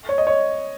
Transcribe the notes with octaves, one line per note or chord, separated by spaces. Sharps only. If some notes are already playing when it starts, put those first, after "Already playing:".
C#5
D#5
C#5